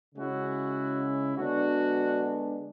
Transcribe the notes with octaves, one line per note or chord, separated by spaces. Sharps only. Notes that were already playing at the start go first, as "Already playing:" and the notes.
C#3 G#3 C#4 E4 F#4
D3 G#3 B3 D4 F#4